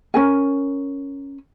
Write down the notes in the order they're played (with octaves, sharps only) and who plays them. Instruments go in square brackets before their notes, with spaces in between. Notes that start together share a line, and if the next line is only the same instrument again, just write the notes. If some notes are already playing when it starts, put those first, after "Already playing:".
[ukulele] C#4 A#4 G#5